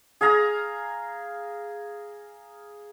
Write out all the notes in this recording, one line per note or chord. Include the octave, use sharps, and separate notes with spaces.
G#4 F5 G#5 A#5